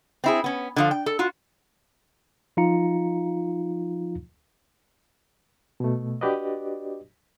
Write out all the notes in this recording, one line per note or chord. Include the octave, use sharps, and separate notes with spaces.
C4 E4 G#4
B3 C#4
D3 F3 F5
G5
A4
F4 F#4
F3 D#4 F4 F5 A#5 C#7
B2 A3
D4 F#4 G4 B4 D5 D#5